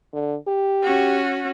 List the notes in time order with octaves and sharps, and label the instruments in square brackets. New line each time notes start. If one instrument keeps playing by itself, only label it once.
[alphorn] D3
G4
[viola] C#4 F#4